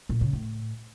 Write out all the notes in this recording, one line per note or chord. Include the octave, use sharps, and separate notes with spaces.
A#2
C#3
A2